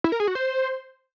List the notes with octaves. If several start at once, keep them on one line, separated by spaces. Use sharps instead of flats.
E4
A#4
G#4
F#4
C5